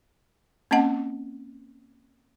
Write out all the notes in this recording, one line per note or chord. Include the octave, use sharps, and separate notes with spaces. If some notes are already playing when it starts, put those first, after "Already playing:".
A#3 C4 C#4 D#5 F#5 A5